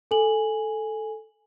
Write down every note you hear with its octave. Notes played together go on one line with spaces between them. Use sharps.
A4 G#5 F#7